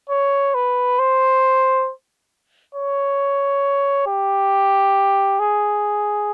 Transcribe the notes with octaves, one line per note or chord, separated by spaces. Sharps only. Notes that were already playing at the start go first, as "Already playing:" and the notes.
C#5
B4
C5
C#5
G4
G#4